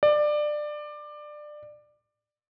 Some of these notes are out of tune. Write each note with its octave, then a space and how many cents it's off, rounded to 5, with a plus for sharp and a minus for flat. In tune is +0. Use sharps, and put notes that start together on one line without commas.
D5 +20